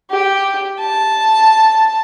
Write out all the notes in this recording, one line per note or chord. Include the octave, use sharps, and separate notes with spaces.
G4
A5